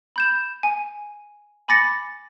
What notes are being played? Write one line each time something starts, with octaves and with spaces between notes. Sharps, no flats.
B5 G6 E7
G#5
G#5 B5 D6 A6 A#6 C#7